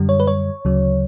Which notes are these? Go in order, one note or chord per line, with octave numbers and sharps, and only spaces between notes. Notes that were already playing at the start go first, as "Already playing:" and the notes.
Already playing: F#2 D3 G3
C#5
B4
C#5
D2 C#3 F#3